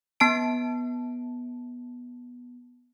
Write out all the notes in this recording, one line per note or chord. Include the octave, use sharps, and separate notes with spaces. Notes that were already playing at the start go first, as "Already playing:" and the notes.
B3 A5 D7